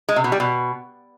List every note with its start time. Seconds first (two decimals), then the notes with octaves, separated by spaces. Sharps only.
0.09 G#3
0.16 C3
0.24 B2
0.32 G3
0.40 B2